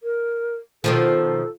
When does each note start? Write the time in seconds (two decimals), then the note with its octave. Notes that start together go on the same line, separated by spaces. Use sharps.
0.03 A#4
0.84 B2 D#3 F3 A4